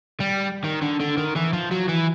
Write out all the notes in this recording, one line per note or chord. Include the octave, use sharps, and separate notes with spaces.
G3
D#3
D3
D3
D#3
E3
F3
F#3
E3